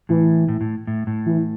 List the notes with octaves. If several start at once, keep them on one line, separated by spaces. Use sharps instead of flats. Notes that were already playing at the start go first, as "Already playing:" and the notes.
A2 E3
A2
A2
A2
A2
E3